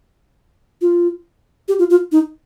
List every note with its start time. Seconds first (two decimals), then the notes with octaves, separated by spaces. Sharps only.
0.81 F4
1.68 G4
1.79 F4
1.90 F4
2.12 D#4